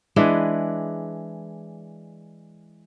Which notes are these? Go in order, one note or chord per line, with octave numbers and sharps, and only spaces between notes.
E3 G#3 D4 B4